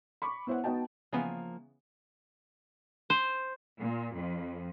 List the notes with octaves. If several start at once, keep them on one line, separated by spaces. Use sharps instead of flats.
B5 C#6 D6
B3 E4 C5 C#5 F#5
B3 D#4 F#4 D#5 G5 A5
C#3 E3 F3 A#3 B3 G#5
C5
A#2
F2